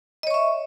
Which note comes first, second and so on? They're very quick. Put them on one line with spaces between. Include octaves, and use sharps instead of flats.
D#5 C#5 C#6 E5